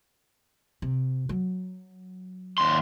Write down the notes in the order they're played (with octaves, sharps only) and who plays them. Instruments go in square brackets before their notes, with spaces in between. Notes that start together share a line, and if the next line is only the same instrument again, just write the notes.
[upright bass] C3
F#3
[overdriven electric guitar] D#2 C6